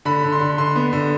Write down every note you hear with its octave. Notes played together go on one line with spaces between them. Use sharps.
D3 B5
D3
C6
D3
D3 C6
B3
D3